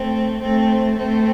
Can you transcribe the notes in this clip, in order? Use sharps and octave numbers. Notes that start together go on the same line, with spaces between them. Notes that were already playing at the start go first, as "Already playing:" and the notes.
Already playing: A3 C4
A3 C4
A3 C4